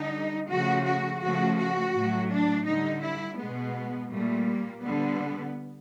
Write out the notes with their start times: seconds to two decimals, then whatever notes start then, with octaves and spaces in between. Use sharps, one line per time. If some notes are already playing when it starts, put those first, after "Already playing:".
Already playing: D3 G3 D#4
0.49 C#3 F3 A3 F#4
0.85 F#4
1.21 C#3 F3 A3 F#4
1.58 F#4
1.94 A2 F#3 A3
2.30 D4
2.66 D3 G3 D#4
3.02 E4
3.38 B2 G#3 B3
4.10 A#2 G3 A3
4.47 A#3
4.83 D3 G3 B3